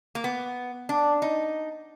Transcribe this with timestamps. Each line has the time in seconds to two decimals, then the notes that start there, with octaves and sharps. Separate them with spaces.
0.15 A#3
0.24 B3
0.89 D4
1.22 D#4